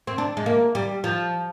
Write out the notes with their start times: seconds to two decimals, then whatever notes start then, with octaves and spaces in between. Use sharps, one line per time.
0.07 C4
0.18 D4
0.37 G#3
0.46 A#3
0.75 G3
1.04 F3